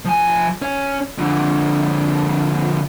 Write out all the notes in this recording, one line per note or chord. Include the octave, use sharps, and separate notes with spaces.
F3 G#5
C#4
F2 D3